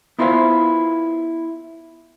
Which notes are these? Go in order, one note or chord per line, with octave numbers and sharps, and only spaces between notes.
B3 E4 F4 B4 C5 F5